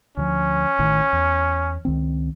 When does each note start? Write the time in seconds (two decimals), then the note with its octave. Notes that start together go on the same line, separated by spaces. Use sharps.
0.17 D2 E3 F3 C#4
0.79 A1 A2 D#3
1.13 E2
1.85 C#2 D#3 C4